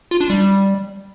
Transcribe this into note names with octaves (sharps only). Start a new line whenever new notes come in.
F4
D4
G3